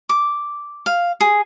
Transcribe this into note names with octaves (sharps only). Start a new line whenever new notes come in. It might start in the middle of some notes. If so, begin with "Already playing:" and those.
D6
F5
G#4